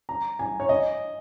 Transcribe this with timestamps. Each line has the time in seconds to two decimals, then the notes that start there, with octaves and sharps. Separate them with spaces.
0.09 A#5
0.39 G#5
0.60 C#5
0.69 D#5